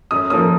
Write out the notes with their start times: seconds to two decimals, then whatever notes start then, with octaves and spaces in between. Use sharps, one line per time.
0.11 F#2 D#6
0.30 F3 A#3 D#6